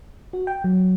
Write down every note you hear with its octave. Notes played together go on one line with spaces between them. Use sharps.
F#4
G5
F#3